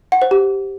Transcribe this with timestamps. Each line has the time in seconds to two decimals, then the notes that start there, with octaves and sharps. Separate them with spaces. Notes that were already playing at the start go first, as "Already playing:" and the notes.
0.12 F#5
0.22 C5
0.31 G4